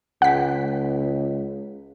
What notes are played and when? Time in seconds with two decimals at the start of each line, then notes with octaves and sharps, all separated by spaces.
0.22 C#2 F#5 B6